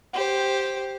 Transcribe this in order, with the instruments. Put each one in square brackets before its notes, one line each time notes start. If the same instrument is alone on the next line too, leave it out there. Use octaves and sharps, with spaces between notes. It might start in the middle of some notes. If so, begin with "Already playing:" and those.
[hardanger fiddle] G4 C5